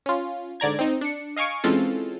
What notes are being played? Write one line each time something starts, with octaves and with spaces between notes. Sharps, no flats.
C#4 F4
G#2 D3 D5 A#5 G#6
C4 D#4
D4 C#7
D#5 F5 G#5 C#6 D7
E3 G#3 C4 C#4 F4 A4